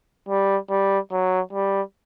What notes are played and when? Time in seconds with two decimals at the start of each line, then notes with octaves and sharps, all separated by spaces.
0.28 G3
0.70 G3
1.11 F#3
1.52 G3